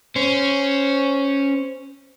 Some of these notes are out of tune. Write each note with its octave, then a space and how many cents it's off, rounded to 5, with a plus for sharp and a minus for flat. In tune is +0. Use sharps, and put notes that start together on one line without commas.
C#4 +0 C5 -10